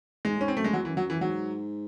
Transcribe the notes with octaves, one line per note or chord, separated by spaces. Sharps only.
G#2 G#3
A2
G#2 C#4
C4
F#2 A3
G#3
E2 F#3
E3
F#2
F#3
F#2 E3
G#2 F#3